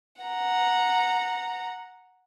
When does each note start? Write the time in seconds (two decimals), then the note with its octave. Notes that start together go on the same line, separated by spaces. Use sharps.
0.22 F#5 A#5